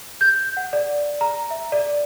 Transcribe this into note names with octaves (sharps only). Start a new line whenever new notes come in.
G6
F#5
D5
A#5
E5
D5